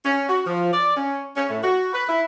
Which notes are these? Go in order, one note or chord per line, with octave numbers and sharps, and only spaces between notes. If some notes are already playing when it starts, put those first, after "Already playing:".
C#4
F#4
F3
D5
C#4
C#4
A2
F#4
B4
E4